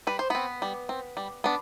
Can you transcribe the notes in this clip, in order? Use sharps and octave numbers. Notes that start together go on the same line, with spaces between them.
G3 B4
C5
B3 C4 B4
G3
C4
G3
B3 D4